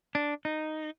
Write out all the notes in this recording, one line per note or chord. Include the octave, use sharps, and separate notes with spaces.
D4
D#4